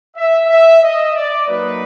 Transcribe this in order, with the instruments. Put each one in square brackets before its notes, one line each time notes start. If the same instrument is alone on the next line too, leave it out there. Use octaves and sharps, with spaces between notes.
[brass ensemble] E5
E5
D#5
D5
F#3 A#3 D#4 B4